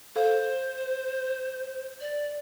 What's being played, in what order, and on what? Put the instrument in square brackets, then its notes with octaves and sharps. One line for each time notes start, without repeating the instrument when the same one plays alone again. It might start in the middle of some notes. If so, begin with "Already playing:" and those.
[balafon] A4 F5 [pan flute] C5
[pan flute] D5